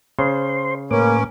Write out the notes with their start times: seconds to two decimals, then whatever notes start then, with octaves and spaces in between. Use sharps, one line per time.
0.19 C#3 C5 C6
0.91 A2 A#3 C#4 B4 D6